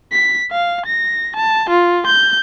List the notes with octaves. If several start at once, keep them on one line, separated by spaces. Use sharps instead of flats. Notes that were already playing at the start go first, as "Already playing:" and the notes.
B6
F5
A#6
A5
F4
G6